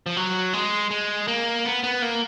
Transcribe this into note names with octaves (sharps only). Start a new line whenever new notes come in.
F3
F#3
G#3
G#3
A#3
B3
B3
A#3